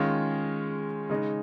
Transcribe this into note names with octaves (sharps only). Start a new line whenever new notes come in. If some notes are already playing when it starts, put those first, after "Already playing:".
Already playing: D#3 G#3 C#4 F4
C#3 G#3 D#4